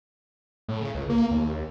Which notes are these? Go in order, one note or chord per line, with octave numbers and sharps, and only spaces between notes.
A2
C#3
C#2
A#3
D#2